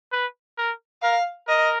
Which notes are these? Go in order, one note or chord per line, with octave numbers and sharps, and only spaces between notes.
B4
A#4
A#4 F5
A#4 D#5